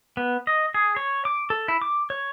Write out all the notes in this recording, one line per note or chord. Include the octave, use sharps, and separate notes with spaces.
B3
D#5
G#4
C#5
D6
A4
E4
D6
C#5